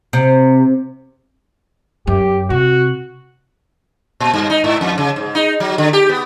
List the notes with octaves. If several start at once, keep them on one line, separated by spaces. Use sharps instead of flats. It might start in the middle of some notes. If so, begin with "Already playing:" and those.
C3
F#2 G4
C3 F#4
A#2
G2
D#4
G#2
F2
C#3
G#2
D#4
F#3
D3
G4
B3